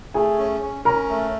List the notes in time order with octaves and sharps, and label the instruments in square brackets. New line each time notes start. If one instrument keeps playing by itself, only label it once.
[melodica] A3 [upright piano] G#4 G#5
[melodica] C#4
C#4
[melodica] C#4 [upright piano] A#4 A#5
[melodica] A3